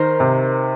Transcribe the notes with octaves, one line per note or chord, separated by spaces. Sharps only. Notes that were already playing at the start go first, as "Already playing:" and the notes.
Already playing: D#3 A#4 C5
C3